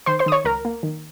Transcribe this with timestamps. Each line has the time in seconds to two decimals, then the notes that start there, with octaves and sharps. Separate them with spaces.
0.06 D#3 C5 C6
0.19 C5 C6
0.26 D#3 D#6
0.32 C#5 C#6
0.44 C#2 A#4 A#5
0.65 A#3
0.83 D#3